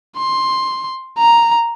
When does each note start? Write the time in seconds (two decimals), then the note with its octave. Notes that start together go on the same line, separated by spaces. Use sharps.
0.16 C6
1.18 A#5